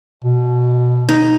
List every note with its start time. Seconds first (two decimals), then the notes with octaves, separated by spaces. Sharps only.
0.24 B2
1.09 D#4